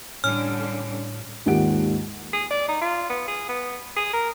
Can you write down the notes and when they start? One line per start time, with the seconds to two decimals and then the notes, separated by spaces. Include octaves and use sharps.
0.24 A2 D3 G3 C#4 F6
1.46 D#2 G#2 F4 G4 F#5 D7
2.33 G#4
2.51 D5
2.68 D#4
2.82 F4
3.10 B3
3.28 G#4
3.49 B3
3.96 G#4
4.13 A#4